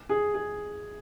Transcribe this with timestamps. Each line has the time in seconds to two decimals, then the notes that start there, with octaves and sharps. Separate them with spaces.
0.09 G#4
0.34 G#4